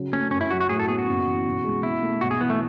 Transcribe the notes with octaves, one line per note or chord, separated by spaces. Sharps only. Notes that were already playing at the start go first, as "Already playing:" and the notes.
Already playing: C#3 F#3
A3 C#4
F#2 C#4
E4
F#3 F#4
F#4
A2 G#4
A4
B3 G#4
F#4
F#1
E3
B1
G#3
B2 E4
A3
B1 F#4
G#4
E3 B3
A3